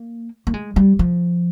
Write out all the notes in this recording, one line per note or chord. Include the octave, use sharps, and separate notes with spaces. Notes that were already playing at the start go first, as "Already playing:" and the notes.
Already playing: A#3
A#3
G#3
G3
F3